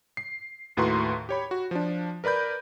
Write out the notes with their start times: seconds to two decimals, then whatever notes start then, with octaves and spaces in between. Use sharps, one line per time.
0.17 C7
0.77 D#2 A2 F#4 B4 A#5 C6
1.29 G4 C#5 B5
1.51 F#4
1.71 F3 D4
2.24 A#4 B4 D5 B5 G6